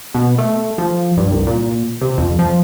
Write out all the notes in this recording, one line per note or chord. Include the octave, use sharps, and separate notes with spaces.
B2
A3
F3
G2
C2
A#2
C3
F2
F3